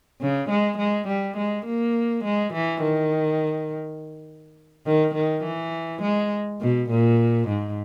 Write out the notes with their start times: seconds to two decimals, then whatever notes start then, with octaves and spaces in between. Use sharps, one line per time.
0.20 C#3
0.49 G#3
0.78 G#3
1.07 G3
1.37 G#3
1.66 A#3
2.24 G#3
2.53 E3
2.82 D#3
4.86 D#3
5.15 D#3
5.44 E3
6.02 G#3
6.61 B2
6.90 A#2
7.48 G#2